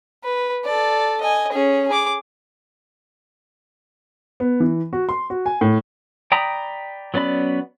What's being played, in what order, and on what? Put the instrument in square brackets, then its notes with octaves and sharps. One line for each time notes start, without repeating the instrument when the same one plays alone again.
[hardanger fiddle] B4
A4 D5
D#5 G#5
C#4 G#4
G#4 D6
[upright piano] B3
E3
F#4
C6
F#4
G#5
A2
[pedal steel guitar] D5 G5 A#5 B5 D#6
F#3 B3 C#4 D5 B5